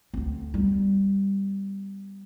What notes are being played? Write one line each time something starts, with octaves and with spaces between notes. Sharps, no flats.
D2 C4
G3 B3